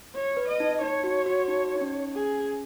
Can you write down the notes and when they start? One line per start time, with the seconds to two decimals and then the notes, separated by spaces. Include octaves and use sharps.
0.15 C#5
0.37 B4
0.48 D#5
0.60 D#4
0.81 D#4 C#5
1.04 F#4
1.26 F#4
1.39 F#4
1.48 D#4
1.76 D#4
1.81 C#4
2.14 G#4